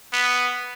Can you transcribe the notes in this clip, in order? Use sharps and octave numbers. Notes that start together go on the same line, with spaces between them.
B3